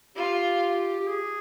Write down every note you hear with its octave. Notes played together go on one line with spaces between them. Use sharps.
F4 G4
G4
G#4